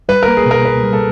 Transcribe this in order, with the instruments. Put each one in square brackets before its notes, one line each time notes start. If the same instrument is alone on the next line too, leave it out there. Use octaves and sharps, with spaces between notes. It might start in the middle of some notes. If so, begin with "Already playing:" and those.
[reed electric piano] G3 [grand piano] B4
[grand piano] A#4
[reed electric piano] A#3
[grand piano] G#4
[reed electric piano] B2
[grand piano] A#4
[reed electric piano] C#2 [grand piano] B4
[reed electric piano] G3
[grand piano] A4